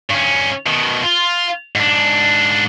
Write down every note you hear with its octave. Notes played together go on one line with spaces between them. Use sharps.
G2 C#4
B2 D#3
F4
G#2 D4